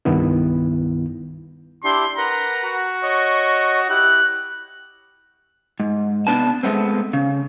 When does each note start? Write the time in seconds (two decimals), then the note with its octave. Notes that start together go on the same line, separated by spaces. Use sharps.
0.05 C2 G2 D#3 B3 E4
1.84 D4 E4 G4 C6
2.18 A#4 B4 F#5 A#5
2.65 F#4
3.03 C#5 D#5
3.89 E4 G4 F#6
5.80 G#2
6.27 C3 F3 B3 D4 B4 A5
6.63 G#3 A3 B3 C4
7.13 C#3